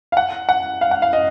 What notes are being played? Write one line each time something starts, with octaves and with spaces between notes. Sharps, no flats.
F5
F#5
F#5
F5
F#5
F5
D#5